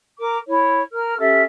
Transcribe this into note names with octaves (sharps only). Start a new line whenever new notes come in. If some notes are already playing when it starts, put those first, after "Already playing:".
A#4 D6
E4 C#5
A#4 F6
C#4 G4 A4 E5